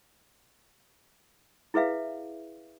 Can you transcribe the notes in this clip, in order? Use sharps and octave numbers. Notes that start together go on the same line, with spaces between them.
E4 G#4 B4 E5 F5